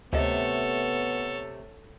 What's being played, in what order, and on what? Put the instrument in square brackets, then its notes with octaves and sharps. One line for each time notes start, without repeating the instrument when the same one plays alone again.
[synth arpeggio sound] D2 D#5 [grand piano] C3 A3 [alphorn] B3 [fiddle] A4 C#5